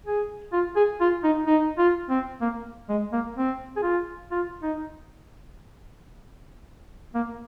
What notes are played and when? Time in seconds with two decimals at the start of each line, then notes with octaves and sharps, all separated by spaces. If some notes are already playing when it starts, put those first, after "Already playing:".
0.06 G#4
0.53 F4
0.76 G#4
1.00 F4
1.24 D#4
1.47 D#4
1.78 F4
2.10 C4
2.41 A#3
2.89 G#3
3.12 A#3
3.37 C4
3.76 G#4
3.83 F4
4.31 F4
4.63 D#4
7.14 A#3